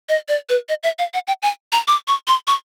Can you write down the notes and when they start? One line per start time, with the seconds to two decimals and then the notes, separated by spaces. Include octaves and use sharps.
0.09 D#5
0.28 D5
0.49 B4
0.69 D#5
0.83 E5
0.99 F5
1.14 F#5
1.27 G5
1.43 G#5
1.72 A#5
1.88 D6
2.08 C#6
2.28 C6
2.47 C#6